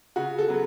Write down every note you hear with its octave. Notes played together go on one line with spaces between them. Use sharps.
C#3 F#4
A4
F#3 B3